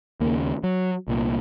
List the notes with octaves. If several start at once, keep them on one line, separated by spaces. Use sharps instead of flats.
D#2 C#3 A#3
F#3
C2 A#2